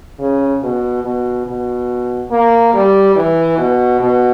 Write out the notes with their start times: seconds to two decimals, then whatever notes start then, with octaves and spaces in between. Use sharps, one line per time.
0.19 C#3
0.63 B2
1.04 B2
1.46 B2
2.31 A#3
2.74 G3
3.16 E3
3.58 B2
4.00 B2